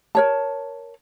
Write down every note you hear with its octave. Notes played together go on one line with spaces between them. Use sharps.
A#4 C#5 A5